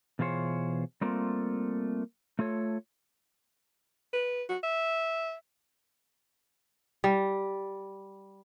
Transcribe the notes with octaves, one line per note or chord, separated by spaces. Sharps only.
B2 E3 F4 G#4 C5 C#5
G3 A3 A#3 C4 F4
A3 F4 A4 C#5
B4
F#4
E5
G3